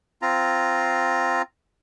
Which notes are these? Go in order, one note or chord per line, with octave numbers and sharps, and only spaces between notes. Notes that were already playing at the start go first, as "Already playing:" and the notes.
C4 F4 A#5